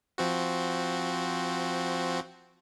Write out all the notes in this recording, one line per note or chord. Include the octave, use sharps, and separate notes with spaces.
F3 C4 F#4